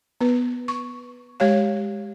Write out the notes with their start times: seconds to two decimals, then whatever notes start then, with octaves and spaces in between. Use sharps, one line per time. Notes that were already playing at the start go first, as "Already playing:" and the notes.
0.21 B3 B4
0.68 C#6
1.40 G#3 G4 C#5 F5